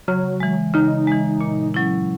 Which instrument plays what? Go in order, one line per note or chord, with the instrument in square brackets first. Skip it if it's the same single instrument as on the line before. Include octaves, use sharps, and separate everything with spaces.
[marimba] C#3 [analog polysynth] F#3
[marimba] E3 G#3
[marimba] C#3 [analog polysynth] D#4
[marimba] E3 G#3
A#2
F#3 C#4 E4